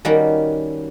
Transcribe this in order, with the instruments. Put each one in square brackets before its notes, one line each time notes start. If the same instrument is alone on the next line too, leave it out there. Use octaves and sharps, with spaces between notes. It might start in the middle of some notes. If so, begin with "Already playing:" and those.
[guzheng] D#3 G3 A#3 C#4 F#4